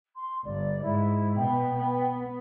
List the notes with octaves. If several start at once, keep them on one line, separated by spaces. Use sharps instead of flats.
C6
G1 D5
G#2 E4
B2 B3 G5
B3